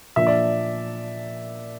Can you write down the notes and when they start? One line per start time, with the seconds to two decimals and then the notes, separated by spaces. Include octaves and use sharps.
0.16 A#2 F3 A#3 D4 E5
0.27 D5